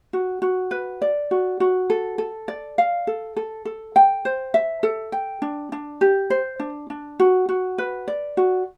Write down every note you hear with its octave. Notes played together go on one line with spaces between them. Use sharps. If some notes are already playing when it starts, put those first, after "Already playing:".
F#4
F#4
B4
D5
F#4
F#4
A4
A4
D5
F5
A4
A4
A4
G5
C5
E5
A4
G5
D4
D4
G4
C5
D4
D4
F#4
F#4
B4
D5
F#4